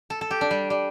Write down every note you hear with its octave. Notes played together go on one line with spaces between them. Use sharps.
A4
A4
G4
D4
G3
G3